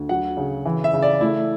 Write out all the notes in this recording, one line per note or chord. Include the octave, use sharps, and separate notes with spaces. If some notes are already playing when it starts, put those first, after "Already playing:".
Already playing: D2
F#3 F#5
C#3
E3
E5
C#3
D5
A3 E4